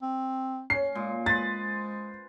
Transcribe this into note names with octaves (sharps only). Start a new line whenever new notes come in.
C4
C#4 C7
A#2 G#3
G#3 B4 C5 A6